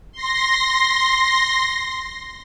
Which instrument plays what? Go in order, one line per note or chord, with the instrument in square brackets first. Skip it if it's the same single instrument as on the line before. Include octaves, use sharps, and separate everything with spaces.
[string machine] C6 A#6